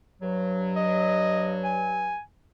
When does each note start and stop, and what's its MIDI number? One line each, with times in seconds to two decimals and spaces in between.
0.22 2.18 43
0.22 2.18 54
0.76 1.54 75
1.64 2.20 80